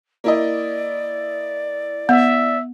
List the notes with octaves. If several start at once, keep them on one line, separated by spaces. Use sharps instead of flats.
A#3 E4 D5 D#5
B3 E5